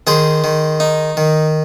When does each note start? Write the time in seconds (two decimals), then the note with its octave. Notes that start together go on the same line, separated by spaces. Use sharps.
0.07 D#3 G#4 C5
0.44 D#3
0.80 D#4
1.17 D#3